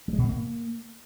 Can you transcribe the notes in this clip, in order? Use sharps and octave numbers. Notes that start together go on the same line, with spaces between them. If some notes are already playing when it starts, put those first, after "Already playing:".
G3
G#3
B2
G2
A#3